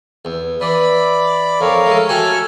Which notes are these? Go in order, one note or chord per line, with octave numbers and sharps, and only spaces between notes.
E2
E3 D5 B5
F2 A#4 C#5 F5
G#3 A3
C#4 F#4 G4 A4 G#5 F6